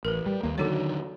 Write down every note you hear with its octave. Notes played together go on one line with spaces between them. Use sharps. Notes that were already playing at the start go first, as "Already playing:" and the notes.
A1 A#4 B4
G3
D#2 A#3
D3 D#3 F#3 F#4 A4 C#5